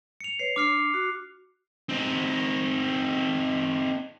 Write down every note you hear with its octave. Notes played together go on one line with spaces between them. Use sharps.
C#7 F7
B4 C#5 C7
D4 D6 F6 C7
F#4
C4 D#4